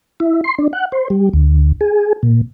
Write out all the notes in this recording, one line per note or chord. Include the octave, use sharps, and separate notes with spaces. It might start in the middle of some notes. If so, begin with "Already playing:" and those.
E4
C6
D4
F#5
C5
G3
D2
G#4
A#2